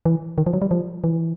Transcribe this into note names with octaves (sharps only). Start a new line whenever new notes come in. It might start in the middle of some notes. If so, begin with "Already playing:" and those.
E3
D#3
F3
F#3
G3
F3
E3